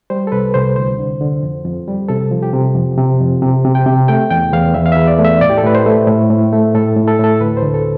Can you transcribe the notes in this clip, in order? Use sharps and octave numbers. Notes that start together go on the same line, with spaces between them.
G3 C5
A4
C2 B4
C2 C5
D2 C5
D3
D3
F2
F2
G3
C3 A4
F3
G4
C3
F2
C3
F2
C3
C3
G5
C3
A3 G5
E2 G5
E2 F5
E2 E5
F5
E5
E2
D5
A3
E5
A2 D5
G4
A4
A2 B4
C5
A3
A2
A2
A3
A2 A4
A2
A4
A2
A4
D2 B4
C5
D2
A4